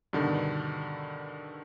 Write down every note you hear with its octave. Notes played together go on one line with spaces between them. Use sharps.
G2 B2 D3 D#3